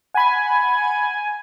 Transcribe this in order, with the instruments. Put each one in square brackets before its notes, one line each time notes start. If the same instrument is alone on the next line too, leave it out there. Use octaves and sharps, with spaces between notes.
[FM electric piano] F#5 B5 [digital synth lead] G#5